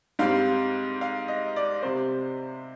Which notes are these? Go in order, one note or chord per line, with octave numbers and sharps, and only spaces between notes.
G#2 G3 C4 F5
F5
D#5
D5
C3 G3 C4 C5